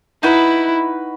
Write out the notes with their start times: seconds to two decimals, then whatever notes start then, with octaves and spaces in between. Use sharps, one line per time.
0.23 D#4 E4 F#4 B4